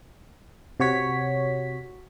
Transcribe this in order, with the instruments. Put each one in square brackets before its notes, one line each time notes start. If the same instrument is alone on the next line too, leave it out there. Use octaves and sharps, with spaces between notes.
[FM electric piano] C3 F#4 C#5 B6